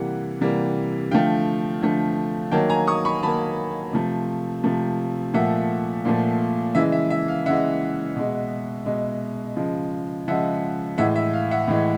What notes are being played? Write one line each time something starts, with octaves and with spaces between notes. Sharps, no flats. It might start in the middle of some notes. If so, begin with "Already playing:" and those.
Already playing: C3 E3 G3 A#3 F#5
C3 E3 G3 A#3
D3 F3 A3 F5 G5
D3 F3 A3
D#3 F#3 A#3 G5 A5
G#5 A#5
C#6 D#6
B5 C#6
D#3 F#3 A#3 A5 B5
C3 F3 A3
C3 F3 A3
A#2 F3 A3 E5 F#5
A#2 F3 A3
C#3 E3 G#3 E5
E5
E5
F5
C#3 E3 G#3 E5 F#5
B2 G#3
B2 G#3
C#3 F3 G#3
C#3 F3 G#3 E5 F#5
A2 E3 G#3 E5 F#5
E5
F5
E5 F#5
A2 E3 G#3